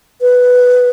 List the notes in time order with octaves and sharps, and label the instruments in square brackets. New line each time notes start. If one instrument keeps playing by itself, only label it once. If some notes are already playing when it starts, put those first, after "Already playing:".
[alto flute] B4